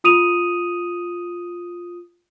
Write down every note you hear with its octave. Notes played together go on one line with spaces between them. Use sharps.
F4 D#6 D#7 F7